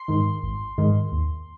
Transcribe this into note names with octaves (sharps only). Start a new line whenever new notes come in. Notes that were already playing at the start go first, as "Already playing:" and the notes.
Already playing: C6
G#2 D#3
G#1
G#2 D#3
D#2